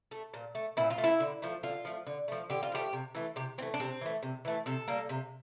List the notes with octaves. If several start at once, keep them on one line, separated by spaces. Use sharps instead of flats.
A3
A#2
A3
A#2 E4
F4
A3
E4
D3
F3 A3
D3 F4
F3 A3
D3
F3 A3
D3 G4
F4
F3 A3 G4
C3
E3 A3
C3 G4
E3 A3 C4
D4
C3 C4
E3 A3
C3
E3 A3
C3 A4
G3 A#3
C3